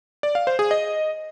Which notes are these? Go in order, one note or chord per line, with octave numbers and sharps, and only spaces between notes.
D5
F5
C5
G#4
D#5